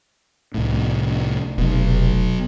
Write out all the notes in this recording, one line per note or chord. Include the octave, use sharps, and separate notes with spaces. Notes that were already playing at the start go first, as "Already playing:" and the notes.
C2 A2
F1 B2 F#3